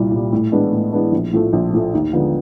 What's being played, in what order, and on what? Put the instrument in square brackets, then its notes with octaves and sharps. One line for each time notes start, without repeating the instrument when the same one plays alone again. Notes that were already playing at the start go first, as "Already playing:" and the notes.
Already playing: [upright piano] C2 A#2 G3
A#2 G3
A2
E3 G#3 B3 D4
A2
E3 G#3 B3 D4
A#1
A2 F3 A3
A#1
A2 F3 A3
D#2
D3 F3 G#3 B3